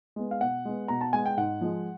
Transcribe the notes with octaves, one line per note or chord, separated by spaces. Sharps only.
G#3 B3
F5
B2 F#5
G#3 B3
B2 A#5
A5
G#3 B3 G#5
G5
G#2 F#5
F3 G#3